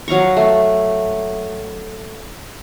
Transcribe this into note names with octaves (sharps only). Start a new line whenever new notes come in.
F#3 F5 A#5 C#6
A3